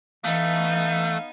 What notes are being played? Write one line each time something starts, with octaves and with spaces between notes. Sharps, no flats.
E3 A3 B3 D#4 F5